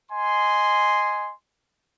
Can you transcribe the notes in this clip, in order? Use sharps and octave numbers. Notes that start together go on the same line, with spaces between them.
D#5 G#5 C6